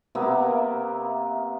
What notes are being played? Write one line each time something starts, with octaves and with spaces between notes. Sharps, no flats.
C3 A#3 B3 E5